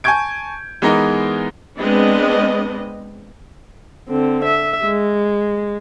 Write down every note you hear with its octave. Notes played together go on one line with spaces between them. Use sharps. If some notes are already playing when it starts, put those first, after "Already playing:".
G#5 A5 C#6 G6 G#6 D7
E3 G#3 B3 D#4 A#4 D#5
G#3 B3 C4 D4 B4 D#5
D3 C4
E5
G#3